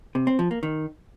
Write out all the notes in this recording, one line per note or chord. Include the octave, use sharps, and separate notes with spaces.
C3
C4
F3
A#3
D#3